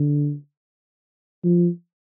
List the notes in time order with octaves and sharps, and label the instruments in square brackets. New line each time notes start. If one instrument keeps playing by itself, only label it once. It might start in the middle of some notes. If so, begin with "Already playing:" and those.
Already playing: [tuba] D3
F3